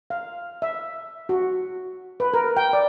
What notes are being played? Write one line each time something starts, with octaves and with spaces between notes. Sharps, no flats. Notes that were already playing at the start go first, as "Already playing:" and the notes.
F5
E5
F#4
B4
A#4
G5
D5